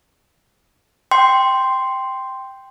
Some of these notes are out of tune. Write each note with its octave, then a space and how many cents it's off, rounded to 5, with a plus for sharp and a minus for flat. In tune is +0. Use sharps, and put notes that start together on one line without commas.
G5 +0 C6 -5